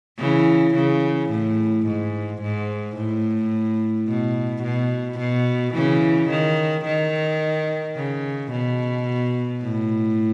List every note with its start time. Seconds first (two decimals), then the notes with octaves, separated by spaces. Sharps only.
0.19 C#3 E3
0.75 C#3
1.30 A2
1.86 G#2
2.42 G#2
2.96 A2
4.07 B2
4.63 B2
5.19 B2
5.74 C#3 E3
6.30 D#3
6.85 D#3
7.96 C#3
8.51 B2
9.62 A2